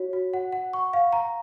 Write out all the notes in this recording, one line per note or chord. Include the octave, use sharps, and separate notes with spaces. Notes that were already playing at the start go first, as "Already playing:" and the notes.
Already playing: F#4 C#5
F#4
F#5
F#5
C#6
F5
A#5